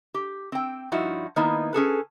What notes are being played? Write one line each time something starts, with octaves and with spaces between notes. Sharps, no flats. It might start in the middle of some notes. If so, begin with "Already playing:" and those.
G4
C4 G5
G2 F3 D#4 E4 F#4
D#3 A#3 B3 D#4 E4
C#4 G#4 A4 B4